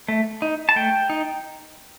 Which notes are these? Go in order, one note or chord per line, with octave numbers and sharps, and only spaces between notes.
A3
D#4
A5
A3 G5
D#4